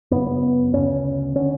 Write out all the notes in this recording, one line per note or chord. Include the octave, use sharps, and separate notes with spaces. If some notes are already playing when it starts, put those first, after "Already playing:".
F#2 C#3 B3
B3
D2 C#3 C#4
D3 C#4